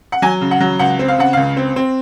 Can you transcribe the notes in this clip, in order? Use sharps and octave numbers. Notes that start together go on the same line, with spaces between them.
F#5
F#3 G#5
C#3
F#5
F#3
C#2 F#5
C4
F5
C#3 F#5
C#2 F5
C4
C4